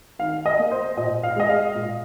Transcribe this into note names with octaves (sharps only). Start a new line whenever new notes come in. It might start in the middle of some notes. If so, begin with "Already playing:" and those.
D#3 F5
D#5
A#3
C5
A#2 D#5
F5
G#3 D#5
F5
A#2